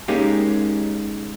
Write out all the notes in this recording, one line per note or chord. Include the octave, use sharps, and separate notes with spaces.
G#3 A#3 C#4 D#4 G4